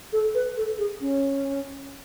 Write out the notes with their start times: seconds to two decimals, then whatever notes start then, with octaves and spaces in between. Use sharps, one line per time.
0.13 A4
0.35 B4
0.57 A4
0.78 G#4
1.01 C#4